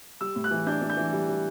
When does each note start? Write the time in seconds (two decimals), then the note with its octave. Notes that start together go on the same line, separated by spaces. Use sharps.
0.21 G3 E6
0.36 A2
0.44 F#6
0.51 E3
0.66 D4 G6
0.82 D4
0.90 G6
0.97 E3
1.13 G3
1.28 G3